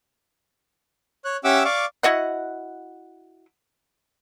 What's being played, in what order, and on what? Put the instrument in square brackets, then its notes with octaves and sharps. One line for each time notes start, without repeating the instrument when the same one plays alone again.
[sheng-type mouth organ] C#5 F#6
C#4 G4 E5 F#5 D6 E6
D5 F5 C#6 D6
[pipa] E4 F#4 D#5 F#5